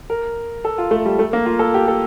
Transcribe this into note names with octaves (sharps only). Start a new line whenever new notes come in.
A#4
A4
F4
A3
G3
A3
A#3
F4
A4
G4
A4